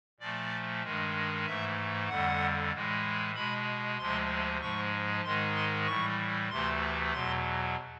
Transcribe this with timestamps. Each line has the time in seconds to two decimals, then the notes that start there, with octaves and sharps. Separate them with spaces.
0.20 A#2 F3 A3 D5
0.83 G2 D#3 G#3
1.45 G#2 E3 A3 E5
2.09 F2 D3 G3 F#5
2.72 A2 E3 G#3
3.35 B2 G#3 B5
3.98 D2 C3 F3 G#3 C6
4.61 G#2 F3 G#3 C#6
5.24 G#2 D#3 G#3 C6
5.56 C6
5.86 A2 E3 G3 C#6
6.50 D2 C3 E3 A3 C6
7.13 E2 B2 F#3 C6